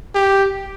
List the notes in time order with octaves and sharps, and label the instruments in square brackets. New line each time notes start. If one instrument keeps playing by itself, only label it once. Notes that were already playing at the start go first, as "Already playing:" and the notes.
[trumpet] G4